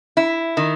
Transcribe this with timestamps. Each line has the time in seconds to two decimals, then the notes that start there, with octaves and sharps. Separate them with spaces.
0.17 E4
0.57 D#3